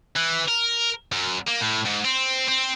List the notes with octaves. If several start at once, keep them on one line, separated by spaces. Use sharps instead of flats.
E3
A#4
F#2
A#3
A2
G#2
C4
C4